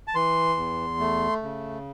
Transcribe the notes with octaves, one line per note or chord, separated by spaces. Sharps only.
A5
E3 C6
E2
A3
C#3